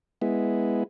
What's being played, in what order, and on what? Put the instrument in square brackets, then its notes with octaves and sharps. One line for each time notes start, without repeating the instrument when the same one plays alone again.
[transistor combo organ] G#3 B3 E4